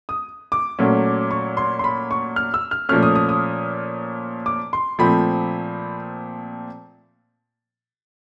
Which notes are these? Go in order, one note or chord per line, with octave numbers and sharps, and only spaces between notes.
D#6
D6
A#2 F#3 A3 C#4
C#6
C6
C6
B5
C#6
F6
E6
F6
A#2 F3 A3 C#4 F6
D#6
D#6
D#6
D6
C6
A#2 F3 A3 C4 B5